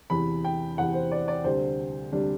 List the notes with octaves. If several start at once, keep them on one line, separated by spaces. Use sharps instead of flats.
E2 C3 E3 B5
G5
E2 C3 E3 F#5
C5
D5
D5
D2 C3 G3 D4 C5
D2 C3 G3 D4